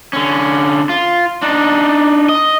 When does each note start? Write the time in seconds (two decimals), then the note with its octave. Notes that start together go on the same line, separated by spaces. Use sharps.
0.13 D3 C#4
0.89 F4
1.43 D4 D#4
2.29 D#5